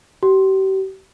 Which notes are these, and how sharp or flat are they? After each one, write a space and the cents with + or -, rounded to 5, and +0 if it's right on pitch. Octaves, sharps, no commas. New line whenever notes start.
G4 -40